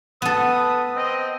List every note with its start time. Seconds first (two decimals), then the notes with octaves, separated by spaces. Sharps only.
0.22 B3 A4 B4 D#6
0.95 C4 D#5